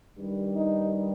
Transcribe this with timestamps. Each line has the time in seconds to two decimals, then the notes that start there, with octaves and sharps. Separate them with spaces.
0.17 G2 D#3 G3
0.55 D#4